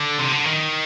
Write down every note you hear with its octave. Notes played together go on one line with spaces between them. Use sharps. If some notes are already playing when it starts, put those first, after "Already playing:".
Already playing: D3
C3
D3
D#3